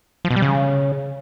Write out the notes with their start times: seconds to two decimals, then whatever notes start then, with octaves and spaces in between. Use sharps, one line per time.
0.25 F3
0.30 B2
0.36 G3
0.42 C#3